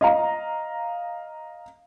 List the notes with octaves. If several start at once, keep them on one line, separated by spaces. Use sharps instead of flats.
D#5 F5 A#5